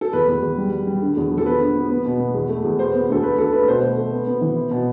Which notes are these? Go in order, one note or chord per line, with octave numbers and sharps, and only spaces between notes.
A4
E2 B4
E2
E2
G3
G3
G3
D3
E2
F3
A4
B3 B4
D3
B3
B3
B2
B3
E2
A3
E2
B3 C5
B3
D2 A4
A3 B4
D3 A4
A3 B4
B2 C5
A3
A3
B3
B3
E3
B3
B2